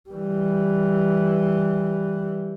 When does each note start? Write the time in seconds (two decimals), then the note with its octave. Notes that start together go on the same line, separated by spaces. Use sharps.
0.10 E3 G3